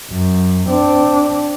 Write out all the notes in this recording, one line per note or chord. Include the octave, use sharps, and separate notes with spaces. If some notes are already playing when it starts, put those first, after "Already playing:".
F#2
C4 D4